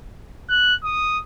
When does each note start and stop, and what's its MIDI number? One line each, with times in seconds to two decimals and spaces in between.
0.49 0.74 90
0.84 1.19 87